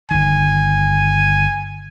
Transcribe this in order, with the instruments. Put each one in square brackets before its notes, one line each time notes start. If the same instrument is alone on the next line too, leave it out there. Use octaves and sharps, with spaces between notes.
[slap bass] G1 D#3 [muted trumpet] G#5